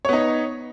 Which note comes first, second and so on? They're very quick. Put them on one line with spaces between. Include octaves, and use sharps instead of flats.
C#5 B3 D#4